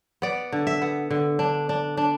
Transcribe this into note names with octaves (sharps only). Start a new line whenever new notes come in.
B3 D5
D3
E5
B3
D3
D4
D4
D4